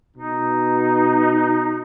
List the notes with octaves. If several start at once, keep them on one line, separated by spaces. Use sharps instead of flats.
B2 D#4